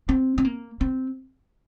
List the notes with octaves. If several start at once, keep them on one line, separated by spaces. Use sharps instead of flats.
C4
C4
A#3
C4